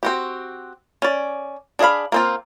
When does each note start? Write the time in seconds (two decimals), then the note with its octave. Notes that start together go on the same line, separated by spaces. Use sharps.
0.03 C4 F#4 G4
1.02 C#4 D5
1.79 D4 G#4 D#5 F5 B5
2.12 A#3 C4 F4